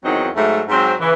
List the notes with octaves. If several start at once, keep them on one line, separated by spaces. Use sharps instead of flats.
E2 D#3 F#3 C4 D#4
G#2 F#3 A3
G#2 F#3 C4
C#3 E3